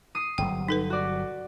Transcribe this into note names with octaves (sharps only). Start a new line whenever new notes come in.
D#6 C7 D#7
G1 C3 F#3 G5
D#4 A4 B4
F#4 D5